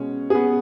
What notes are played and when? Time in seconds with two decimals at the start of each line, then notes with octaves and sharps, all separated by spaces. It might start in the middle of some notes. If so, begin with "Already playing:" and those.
Already playing: B2 G#3 C#4
0.30 G#4
0.35 B3 B4